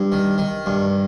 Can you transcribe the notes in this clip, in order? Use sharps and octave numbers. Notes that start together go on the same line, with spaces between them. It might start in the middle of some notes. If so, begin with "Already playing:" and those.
Already playing: G2
D#3
D#3
G2